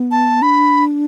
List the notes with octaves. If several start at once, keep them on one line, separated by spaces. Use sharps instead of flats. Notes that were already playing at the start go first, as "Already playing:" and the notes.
Already playing: B3
A5
D4 B5